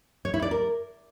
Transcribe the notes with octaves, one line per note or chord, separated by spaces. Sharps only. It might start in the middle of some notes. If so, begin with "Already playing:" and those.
C#5
E4
D5
A#4